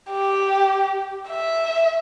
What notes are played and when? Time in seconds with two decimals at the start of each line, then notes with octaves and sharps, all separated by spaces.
0.10 G4
1.29 E5